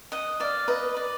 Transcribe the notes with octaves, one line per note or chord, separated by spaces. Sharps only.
D#5 F#5
D5 F5
B4 D#5
D5